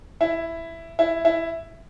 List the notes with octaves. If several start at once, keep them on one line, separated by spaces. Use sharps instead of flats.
E4
E4
E4